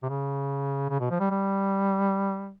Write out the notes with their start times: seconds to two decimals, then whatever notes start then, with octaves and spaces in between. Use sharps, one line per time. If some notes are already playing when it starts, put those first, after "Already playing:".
0.03 C3
0.09 C#3
0.90 C#3
1.00 B2
1.10 F3
1.20 G3
1.30 G3